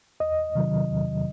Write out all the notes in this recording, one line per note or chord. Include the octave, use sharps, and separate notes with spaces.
E2 D#5
C3 D#3 F#3
E2